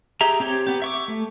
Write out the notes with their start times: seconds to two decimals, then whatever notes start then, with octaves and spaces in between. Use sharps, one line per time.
0.21 G4 G#4 E5 A#5
0.40 C4 G4 C#5
0.67 B3 G4
0.82 E5 C#6 D6
1.08 A3